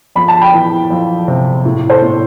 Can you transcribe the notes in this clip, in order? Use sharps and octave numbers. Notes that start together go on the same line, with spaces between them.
F2 B5
A5
G5 B5
E3
F2
C3
A2
A4 C5
A2